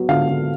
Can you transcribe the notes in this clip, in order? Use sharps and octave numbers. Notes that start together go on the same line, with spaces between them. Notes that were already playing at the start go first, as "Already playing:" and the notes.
Already playing: F#3 B3
D3 F5
D3